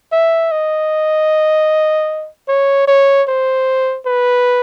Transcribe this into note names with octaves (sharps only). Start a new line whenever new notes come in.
E5
D#5
C#5
C#5
C5
B4